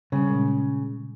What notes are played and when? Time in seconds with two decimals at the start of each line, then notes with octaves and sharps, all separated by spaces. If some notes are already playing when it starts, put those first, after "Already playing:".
0.12 C#3 G3 C#4
0.28 A#2 G#3